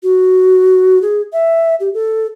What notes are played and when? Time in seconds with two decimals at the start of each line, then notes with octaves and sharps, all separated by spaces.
0.03 F#4
1.02 G#4
1.33 E5
1.80 G4
1.94 A4